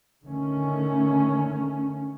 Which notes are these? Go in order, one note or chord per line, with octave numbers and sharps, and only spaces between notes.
D3 D#3 A3 C#4